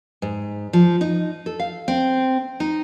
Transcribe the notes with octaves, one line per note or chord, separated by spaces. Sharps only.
G#2
F3
D#4
A4
F5
C4
D#4